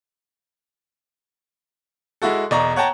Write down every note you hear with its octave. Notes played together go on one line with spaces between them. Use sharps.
G#3 E4 F#4 A4
E1 D5 D#5 A#5 C#6
C#5 F#5 G5 A5 A#5